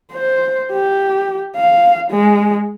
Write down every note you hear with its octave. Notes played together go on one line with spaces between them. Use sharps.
C5
G4
F5
G#3